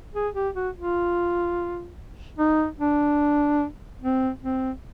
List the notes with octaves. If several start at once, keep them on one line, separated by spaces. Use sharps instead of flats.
G#4
G4
F#4
F4
D#4
D4
C4
C4